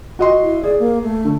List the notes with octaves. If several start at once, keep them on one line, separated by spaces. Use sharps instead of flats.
F#4 D#5 C6
E4
G#4 D5
A#3
A3
D3